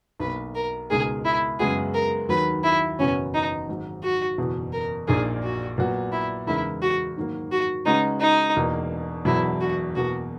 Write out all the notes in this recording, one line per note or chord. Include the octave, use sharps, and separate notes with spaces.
B1 B2 A#3 B4
A#4
C#2 B2 G#3 D#4 G#4 A#4
E4
F#2 C#3 G#3 B3 F#4 G#4
A#4
D#2 D#3 F#3 B4
E4
F#1 E2 B2 F#3 B3 C#4
D#4
G#1 G#2 F#3
F#4
F#1 E2 B2
A#4
A#1 A#2 A#3 D#4 G#4
F#4
A#2 F#3 B3 F#4
E4
E2 C#3 G#3 D#4 E4 A#4
F#4
G#2 D#3 F#3 A#3
F#4
C#3 G#3 C#4 D#4 F#4 B4
D#4
E1 E2 B2 A#3
E1 E2 B2 F#3 E4
F#4
E2 B2 A#3 F#4